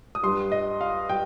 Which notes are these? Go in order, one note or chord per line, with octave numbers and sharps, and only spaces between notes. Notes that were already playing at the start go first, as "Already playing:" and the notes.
D#6
G2 G3 C6
D#5
F5
G3 G5